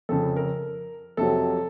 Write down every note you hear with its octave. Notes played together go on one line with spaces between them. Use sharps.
F2 C#3 F3 A4
A#4
F2 C3 F#3 A4